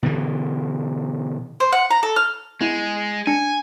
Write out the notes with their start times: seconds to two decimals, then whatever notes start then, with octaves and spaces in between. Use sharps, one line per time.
0.03 B2 D3 E3
1.60 C5
1.72 F#5
1.90 A#5
2.03 A4
2.16 F6
2.61 G#3 B3 E4 G#6
3.27 D4 G#5 C#7